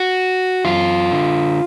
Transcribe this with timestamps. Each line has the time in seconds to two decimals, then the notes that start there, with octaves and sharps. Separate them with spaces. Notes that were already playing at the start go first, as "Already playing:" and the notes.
Already playing: F#4
0.65 F#2 F4
1.12 D3